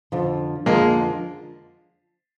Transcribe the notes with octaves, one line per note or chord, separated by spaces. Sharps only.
F2 D3 F3
F2 D3 F3 G#3 A#3